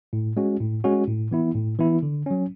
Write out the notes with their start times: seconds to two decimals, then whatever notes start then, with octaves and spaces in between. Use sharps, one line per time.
0.13 A2
0.37 G#3 C#4 F#4
0.60 A2
0.84 G#3 C#4 F#4
1.08 A2
1.31 E3 B3 E4
1.55 A2
1.79 E3 B3 E4
2.03 D3
2.26 F#3 C#4